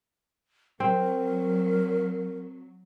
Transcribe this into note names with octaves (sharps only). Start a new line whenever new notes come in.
F#3 C4 A#4